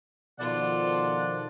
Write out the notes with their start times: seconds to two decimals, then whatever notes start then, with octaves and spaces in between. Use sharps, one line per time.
0.40 B2 D#3 F3 F4 A4 D5 F#5